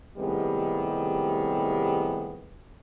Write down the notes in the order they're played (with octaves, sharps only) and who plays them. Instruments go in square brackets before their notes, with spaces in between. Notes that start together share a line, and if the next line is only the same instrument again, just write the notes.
[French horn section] A2 C3 D#3 G3 G#3 B3